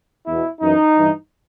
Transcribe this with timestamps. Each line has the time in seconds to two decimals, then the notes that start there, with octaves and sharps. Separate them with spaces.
0.27 E2 B2 E4
0.61 F#2 E3 D#4
0.97 G2 E3